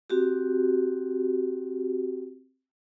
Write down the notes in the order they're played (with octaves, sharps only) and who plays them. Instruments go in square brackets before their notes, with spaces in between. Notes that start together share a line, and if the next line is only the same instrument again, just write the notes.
[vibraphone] C4 F#4 G4